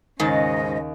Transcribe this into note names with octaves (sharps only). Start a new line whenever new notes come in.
D#2 G#2 C#3 D#5 A6